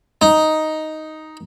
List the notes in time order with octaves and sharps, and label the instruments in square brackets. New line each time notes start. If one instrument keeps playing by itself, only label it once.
[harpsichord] D#4